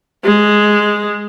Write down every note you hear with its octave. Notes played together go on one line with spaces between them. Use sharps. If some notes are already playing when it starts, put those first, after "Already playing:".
G#3